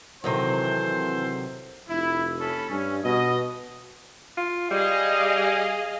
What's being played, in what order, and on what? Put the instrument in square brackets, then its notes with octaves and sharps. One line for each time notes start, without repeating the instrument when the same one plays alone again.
[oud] C3 D#3 F#3 [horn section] E3 A4 C5
[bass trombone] F1 [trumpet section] E4
[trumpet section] C#4 A4 B5
[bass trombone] G2 [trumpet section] C#4
[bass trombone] B2 [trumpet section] D#5
[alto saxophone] F4
[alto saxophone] G3 [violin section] G#4 D#5 F5